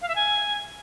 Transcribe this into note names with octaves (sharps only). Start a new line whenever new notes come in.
F5
E5
G#5